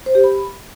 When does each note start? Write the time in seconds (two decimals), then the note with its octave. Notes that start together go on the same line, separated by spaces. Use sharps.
0.06 C5
0.15 G4
0.24 B5